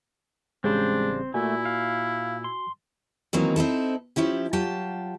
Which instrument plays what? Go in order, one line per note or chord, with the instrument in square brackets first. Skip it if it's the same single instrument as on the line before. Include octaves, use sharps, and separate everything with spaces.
[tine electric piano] A1 C#3 G3 [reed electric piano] G#3 G#4 [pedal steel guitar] C4 C5 [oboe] D4
[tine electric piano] A#2 [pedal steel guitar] A3 [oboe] E4 [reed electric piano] F#4 G#5
[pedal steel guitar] F5
C6
[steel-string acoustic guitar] D#3 E3 F#3 A#3 C4 D#4
C4 D#4 E4 A4
F3 C#4 E4 G4
F#3 F4 G4 A5